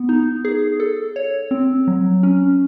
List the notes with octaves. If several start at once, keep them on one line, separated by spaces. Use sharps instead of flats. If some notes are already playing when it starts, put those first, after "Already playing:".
Already playing: B3
D#4
G#4
A4
C#5
C4
F#3
C#4